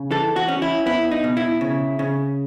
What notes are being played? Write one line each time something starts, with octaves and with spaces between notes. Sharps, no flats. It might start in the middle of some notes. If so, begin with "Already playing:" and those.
Already playing: C#3
E3 A4
F#4
C#4
E4
B3 E4
D#4
B2
E4
C#3
C#3